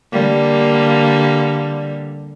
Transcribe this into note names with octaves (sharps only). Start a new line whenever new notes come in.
D3 G3 A#3